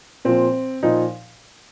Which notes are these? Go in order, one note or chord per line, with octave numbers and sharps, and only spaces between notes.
A#2 F3 C4
A#2 F3 D#4